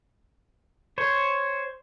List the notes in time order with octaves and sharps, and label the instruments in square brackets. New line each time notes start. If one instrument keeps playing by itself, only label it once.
[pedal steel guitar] C5 C#5